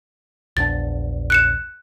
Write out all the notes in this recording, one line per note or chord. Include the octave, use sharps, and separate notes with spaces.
A#1 E2 D4 A6
F#6 C#7 E7